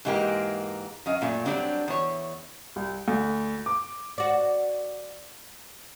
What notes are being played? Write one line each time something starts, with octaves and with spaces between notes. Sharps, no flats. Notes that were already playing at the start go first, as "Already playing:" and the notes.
G#2 E3 G#3 A#3 G4 A#4
F#2 D#5 F5
F#2 A#2 A3
F#3 G3 C4 D4 D#4 G4
E2 C#5
C2
D2
D6
F#4 D5